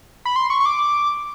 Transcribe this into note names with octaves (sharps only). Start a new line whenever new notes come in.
B5
C6
C#6
C#6
D6